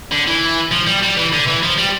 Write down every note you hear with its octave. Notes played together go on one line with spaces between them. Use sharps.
D3
E3
F3
G3
G3
E3
D3
E3
F3
G3